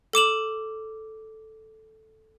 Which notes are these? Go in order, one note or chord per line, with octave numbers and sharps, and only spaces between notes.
A4 D6 E7 F#7